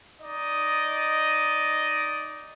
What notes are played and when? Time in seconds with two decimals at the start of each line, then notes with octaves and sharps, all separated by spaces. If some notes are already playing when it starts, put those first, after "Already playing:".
0.20 D#4 D5 D#5